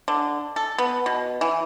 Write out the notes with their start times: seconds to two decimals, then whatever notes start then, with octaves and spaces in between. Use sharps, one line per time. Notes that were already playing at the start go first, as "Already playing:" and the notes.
0.08 D3
0.56 A4
0.78 B3
1.06 B2
1.41 E3